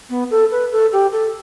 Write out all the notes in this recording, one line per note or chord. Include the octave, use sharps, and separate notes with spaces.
B3
A4
B4
A4
G4
A4